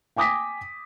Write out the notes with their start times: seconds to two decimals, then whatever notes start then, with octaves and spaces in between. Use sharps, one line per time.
0.16 G5 G#5 D6 D#6 A#6 B6